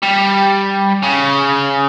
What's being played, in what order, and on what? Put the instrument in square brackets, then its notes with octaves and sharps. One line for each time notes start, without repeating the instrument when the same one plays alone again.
[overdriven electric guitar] G3
C#3